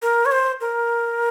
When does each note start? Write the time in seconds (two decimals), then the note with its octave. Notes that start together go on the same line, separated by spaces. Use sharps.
0.02 A#4
0.26 C#5
0.32 C5
0.61 A#4